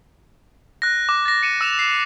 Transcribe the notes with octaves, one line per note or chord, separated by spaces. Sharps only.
F#6 A#6
D6
A6 A#6
A#6 C#7 D#7 E7
E6 E7 F7
C7